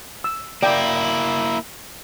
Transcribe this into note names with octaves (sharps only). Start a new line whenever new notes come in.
E6
A#3 E4 D5 G5